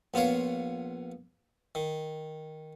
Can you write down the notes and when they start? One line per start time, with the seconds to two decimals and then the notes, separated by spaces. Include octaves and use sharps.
0.14 A#1 B3 F4 C#5 F5
1.75 D#3